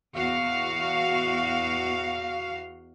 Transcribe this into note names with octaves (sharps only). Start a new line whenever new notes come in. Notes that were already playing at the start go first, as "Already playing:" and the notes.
E2 F#4 F5